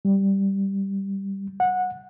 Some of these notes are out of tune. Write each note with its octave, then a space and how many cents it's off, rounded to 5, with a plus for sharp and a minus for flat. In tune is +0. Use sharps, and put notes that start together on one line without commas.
G3 +0
F#5 -15